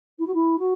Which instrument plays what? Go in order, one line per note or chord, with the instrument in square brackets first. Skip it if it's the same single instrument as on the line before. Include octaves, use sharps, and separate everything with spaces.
[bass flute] E4
F#4
E4
F#4